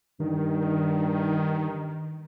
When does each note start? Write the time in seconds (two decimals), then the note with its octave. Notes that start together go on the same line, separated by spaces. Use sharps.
0.20 G2 D#3